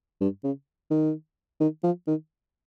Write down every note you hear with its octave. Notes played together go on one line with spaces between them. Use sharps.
G2
C#3
D#3
D#3
F3
D#3